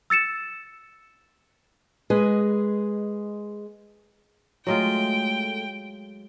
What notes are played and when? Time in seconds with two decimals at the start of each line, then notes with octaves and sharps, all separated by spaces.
0.10 E6 A6 C#7 E7
2.10 G#3 G#4 B4 D#5 G#5
4.67 F#3 G#3 A3 F4 G5